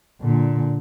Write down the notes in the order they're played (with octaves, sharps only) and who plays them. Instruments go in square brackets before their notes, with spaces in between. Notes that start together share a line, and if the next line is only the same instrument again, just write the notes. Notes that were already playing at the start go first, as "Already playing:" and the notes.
[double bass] A#2 D3